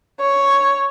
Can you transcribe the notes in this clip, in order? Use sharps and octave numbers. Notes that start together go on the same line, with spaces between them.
C#5